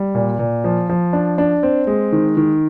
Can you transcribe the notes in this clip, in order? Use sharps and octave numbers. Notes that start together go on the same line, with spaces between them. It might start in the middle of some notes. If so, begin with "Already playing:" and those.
Already playing: G3
A#2
A#2
F3
F3
D4
D4
C4
G#3
D#3
D#3